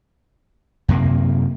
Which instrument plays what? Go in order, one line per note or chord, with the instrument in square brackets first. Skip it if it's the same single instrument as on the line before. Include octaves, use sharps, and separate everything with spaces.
[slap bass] F#2 C3 A#3